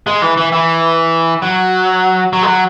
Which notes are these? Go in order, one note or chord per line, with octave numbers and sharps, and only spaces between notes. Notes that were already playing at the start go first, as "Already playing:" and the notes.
G#3
E3
E3
E3
F#3
F#3
G#3
F#3